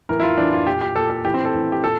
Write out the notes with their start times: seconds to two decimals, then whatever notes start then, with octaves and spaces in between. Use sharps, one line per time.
0.09 A2 E3 A#4
0.20 E4
0.23 F4
0.38 A2 E3 D4
0.53 F4
0.67 A#2 G4
0.81 G4
0.96 A#2 A4
1.10 A4
1.24 A2 E3 G4
1.34 C4
1.45 A4
1.54 A2 E3
1.72 G4
1.83 A#2 A4